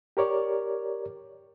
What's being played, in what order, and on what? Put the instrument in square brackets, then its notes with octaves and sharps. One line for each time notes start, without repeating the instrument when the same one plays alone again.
[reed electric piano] G4 A#4 C#5 D5